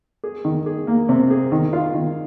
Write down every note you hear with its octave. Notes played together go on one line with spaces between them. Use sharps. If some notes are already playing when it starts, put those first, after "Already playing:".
G#4
D#3
G#4
A#3
C3
G#4
D#3
F4
D#3